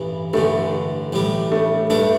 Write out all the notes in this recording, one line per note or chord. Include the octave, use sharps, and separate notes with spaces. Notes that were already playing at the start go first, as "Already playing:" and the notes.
Already playing: A1 G2 E3
A1 G2 D3 A3
A1 A2 G3
A3
G2 G3 A3 D4